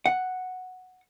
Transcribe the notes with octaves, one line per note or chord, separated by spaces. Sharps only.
F#5